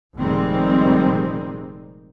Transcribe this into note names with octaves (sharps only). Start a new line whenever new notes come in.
F1 A#2 D#3 G3 G#3 C4